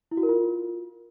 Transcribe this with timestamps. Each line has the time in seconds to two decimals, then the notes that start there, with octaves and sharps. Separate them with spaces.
0.11 E4
0.17 F#4
0.23 A#4
0.29 F4